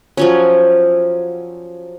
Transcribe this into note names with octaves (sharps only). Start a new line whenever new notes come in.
F3 F#3 C#4